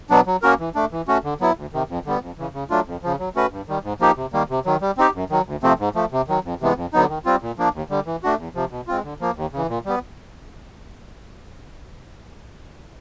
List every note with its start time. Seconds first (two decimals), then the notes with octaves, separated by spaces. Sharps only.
0.10 B2 F#3 B3 D4
0.27 F#3
0.42 A#3 C#4 F#4 A#4
0.59 E3
0.75 A3 D4
0.92 E3
1.08 A3 C#4 F#4
1.24 D3
1.40 F#3 B3 E4
1.56 D2
1.73 C3 D#3
1.89 F2
2.05 D3 G3 B3
2.22 F2
2.38 C#3 E3
2.54 C#3
2.70 F#3 A3 D4 F4
2.87 F2
3.03 C#3 F3
3.19 F#3
3.35 A3 C#4 F#4 B4
3.52 G2
3.68 D#3 G3
3.83 G#2
4.00 F3 A#3 D#4 G4
4.16 C3
4.33 D#3 G3 A#3
4.50 C3
4.66 D#3 F#3
4.81 G3
4.98 C4 D#4 G4
5.14 F#2
5.30 D#3 F#3
5.46 D2
5.63 C3 F3 A3 C4
5.79 G#2
5.95 F3 A3
6.12 C3
6.28 D#3 F#3
6.44 F2
6.61 C3 E3 G#3 B3
6.76 F2
6.93 D3 F#3 B3 D#4
7.09 D#3
7.25 G3 C4 F4
7.42 A#2
7.58 F3 A#3 D4
7.74 D#2
7.90 D3 G3
8.06 E3
8.23 A3 D4 F#4
8.39 E2
8.55 C3 F3
8.71 B2
8.87 G#3 C4 F4
9.04 D3
9.20 F3 A#3
9.36 D#2
9.53 C#3 E3
9.69 A#2
9.85 G3 B3